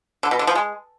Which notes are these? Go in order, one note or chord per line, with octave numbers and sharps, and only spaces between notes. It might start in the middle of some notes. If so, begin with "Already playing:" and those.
D3
B2
D3
F3
G#3